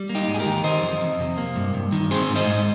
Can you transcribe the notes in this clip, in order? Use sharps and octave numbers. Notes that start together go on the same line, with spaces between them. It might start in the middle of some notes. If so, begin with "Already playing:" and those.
Already playing: G3
A#3
D#4 G4
G#2
G#4
G4 A#4
D#3
D#3 C5 D#5
F2
F2
C3
A#3
G2
G2
D#3
C4 G#4 C5
G#2
C5 D#5
G#2